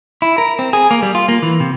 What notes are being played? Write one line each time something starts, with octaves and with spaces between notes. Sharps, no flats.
E4
A#4
C4
G#4
A#3
G3
F4
A#3
E3
C3